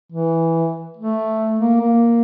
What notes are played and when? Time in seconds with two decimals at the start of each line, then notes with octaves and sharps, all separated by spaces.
0.12 E3
0.97 A3
1.59 A#3
1.81 A#3